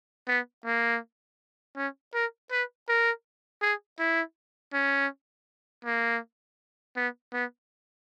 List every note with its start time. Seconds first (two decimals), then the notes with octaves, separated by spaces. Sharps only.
0.28 B3
0.65 A#3
1.76 C#4
2.14 A#4
2.51 B4
2.88 A#4
3.62 G#4
3.99 E4
4.73 C#4
5.85 A#3
6.96 B3
7.33 B3